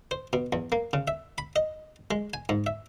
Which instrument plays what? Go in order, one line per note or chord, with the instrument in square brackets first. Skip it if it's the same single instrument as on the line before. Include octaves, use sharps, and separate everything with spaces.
[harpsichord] C5
B2
E2
A#3
C#3
E5
B5
D#5
G#3
G#5
G#2
E5